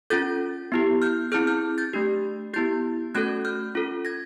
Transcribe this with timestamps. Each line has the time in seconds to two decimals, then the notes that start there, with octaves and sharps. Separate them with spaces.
0.10 C#4 F4 A4 G6 A6
0.72 B3 E4 G4
1.02 F6 G6
1.32 C4 E4 G#4 F6 G6
1.47 F6 G6
1.78 G6 A6
1.94 A3 D4 G4
2.54 B3 E4 G4 G6 A6
3.15 A3 C#4 F#4 A4 F#6 G#6
3.45 F6 G6
3.75 C#4 F4 A4
4.05 G#6 A#6